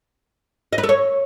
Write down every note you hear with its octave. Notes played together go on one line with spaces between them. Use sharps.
D#5
B4
A4
C#5